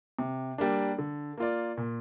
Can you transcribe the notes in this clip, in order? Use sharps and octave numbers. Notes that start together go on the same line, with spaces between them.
C3
G3 A#3 D4
D3
A#3 F4 D5
A#2